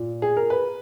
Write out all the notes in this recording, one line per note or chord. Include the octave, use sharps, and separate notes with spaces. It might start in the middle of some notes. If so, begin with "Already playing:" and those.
Already playing: A#2
G#4
A#4
B4